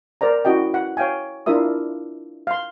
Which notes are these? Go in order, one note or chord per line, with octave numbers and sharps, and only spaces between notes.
A#4 C5 D5 A#5
C#4 E4 F#4 D#5 G5
F#5
C#5 F5 G5 G#5
D4 E4 F4 A#4 E5 D#6
F5 C6